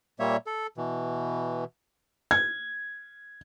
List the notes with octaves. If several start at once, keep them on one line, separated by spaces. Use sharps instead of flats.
A#2 G3 A#3 C#5 E5
A4
B2 E3
G#6